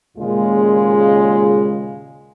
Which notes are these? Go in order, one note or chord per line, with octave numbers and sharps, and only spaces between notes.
D#2 A#2 C#3 G#3 F4